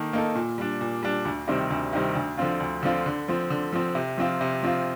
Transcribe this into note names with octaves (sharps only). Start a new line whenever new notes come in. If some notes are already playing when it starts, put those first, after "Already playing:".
Already playing: D#3 A#3 D#4 A4
A#3 D#4 A4
A#2
G3 D4
A#2
G3 D4
D2
C3 D#3 G3 C4
D2
C3 D#3 G3 C4
D2
D3 F3 C4 F4
D2
D3 F3 C4 F4
D3
F3 C4
D3
F3 C4
C3
F3 C4 F4
C3
F3 C4 F4